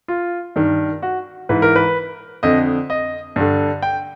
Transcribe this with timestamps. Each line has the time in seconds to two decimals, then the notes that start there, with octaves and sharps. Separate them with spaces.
0.08 F4
0.56 G2 D#3
1.02 F#4
1.49 G#2 E3 B4
1.62 A#4
1.76 B4
2.43 F2 D3 D#5
2.90 D#5
3.36 G2 D3
3.82 G5